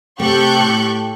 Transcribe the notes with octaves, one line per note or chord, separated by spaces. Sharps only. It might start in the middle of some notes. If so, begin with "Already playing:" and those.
C3 A3 G4 A4 C#6 F#6 G6
A2